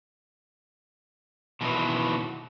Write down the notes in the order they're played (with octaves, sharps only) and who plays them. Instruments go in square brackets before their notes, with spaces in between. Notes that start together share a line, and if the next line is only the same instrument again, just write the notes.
[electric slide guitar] B2 D#3 E3 F#3